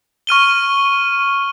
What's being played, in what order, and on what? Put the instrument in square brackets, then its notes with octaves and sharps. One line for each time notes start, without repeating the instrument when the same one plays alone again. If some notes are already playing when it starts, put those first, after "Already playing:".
[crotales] C#6 F6 D#7 G7